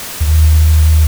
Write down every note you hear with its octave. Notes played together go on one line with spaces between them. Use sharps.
D#2